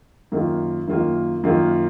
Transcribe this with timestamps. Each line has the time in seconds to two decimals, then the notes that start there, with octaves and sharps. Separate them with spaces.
0.32 F#2 D#3 A#3 F4
0.87 F#2 D#3 A#3 F4
1.44 F#2 D#3 A#3 F4